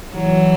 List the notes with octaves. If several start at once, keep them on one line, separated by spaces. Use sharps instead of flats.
E3 F#3